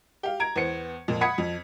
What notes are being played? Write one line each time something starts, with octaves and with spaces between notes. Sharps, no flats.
G4 F5
A#5 G#6 D7
E2 B3 C5 C#7
F2 A#2 F3
F#5 B5 D#6 G#6 B6 C#7
F2